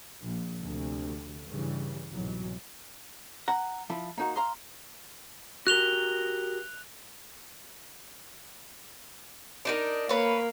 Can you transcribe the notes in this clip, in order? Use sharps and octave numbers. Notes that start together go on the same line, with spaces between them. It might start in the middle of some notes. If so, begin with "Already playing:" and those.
A#1 A#2
D2 C3
G2 C#3 E3 G3
C2 G#2 B2 E3 F#3
F#5 A#5
F3 E4
A#3 D#4 F#4
F5 A#5 C6
F#4 G4 A#4 F#6 F7 G7
D4 D#4 A#4
A#3 B4 C#5